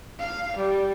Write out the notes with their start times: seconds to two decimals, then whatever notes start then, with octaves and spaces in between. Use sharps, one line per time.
0.19 F5
0.56 G3